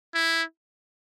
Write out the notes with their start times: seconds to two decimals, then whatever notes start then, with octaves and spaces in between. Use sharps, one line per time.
0.14 E4